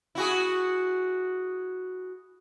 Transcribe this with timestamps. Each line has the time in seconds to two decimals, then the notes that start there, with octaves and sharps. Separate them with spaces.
0.15 E4 F#4 G#4